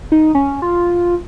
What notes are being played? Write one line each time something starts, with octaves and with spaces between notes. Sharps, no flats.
D#4
C#4
F4